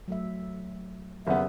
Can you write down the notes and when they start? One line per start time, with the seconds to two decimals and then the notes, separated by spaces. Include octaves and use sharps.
0.08 F#3 A3 E5
1.27 F#1 B3 C#4 G4 G#4 E5